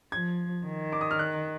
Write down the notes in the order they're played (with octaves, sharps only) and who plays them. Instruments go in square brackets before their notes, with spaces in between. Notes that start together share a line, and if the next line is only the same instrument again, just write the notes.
[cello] F3 [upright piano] G#6
[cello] D#3
[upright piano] D6
D#6
F6
F#6